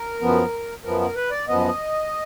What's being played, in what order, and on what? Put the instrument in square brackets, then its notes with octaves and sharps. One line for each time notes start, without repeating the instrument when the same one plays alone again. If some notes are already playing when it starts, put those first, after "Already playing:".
Already playing: [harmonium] A#4
F#2 F3 B3
F#2 F3 B3 A#4
A#4
B4
D5
F#2 F3 B3 D#5